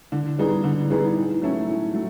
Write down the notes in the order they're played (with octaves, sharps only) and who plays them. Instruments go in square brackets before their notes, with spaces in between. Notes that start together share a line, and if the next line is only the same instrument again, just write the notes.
[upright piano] D3
G3 B3 D#4 G#4
D3
G3 B3 D#4 G#4
A2
F#3 A3 C#4
A2
F#3 A3